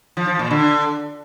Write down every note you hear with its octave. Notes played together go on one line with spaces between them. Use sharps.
F3
F3
A#2
D3